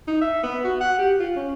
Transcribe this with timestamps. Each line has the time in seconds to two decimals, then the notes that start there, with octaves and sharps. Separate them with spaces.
0.08 D#4
0.21 E5
0.43 B3
0.64 F#4
0.81 F#5
0.98 G4
1.20 F4
1.36 C#4